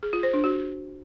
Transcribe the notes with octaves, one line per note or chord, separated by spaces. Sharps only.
G#4
F4
C5
D4
F#4